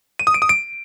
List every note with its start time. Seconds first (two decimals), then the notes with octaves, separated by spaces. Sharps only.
0.19 D#7
0.27 D#6
0.34 D7
0.42 D#6
0.49 D7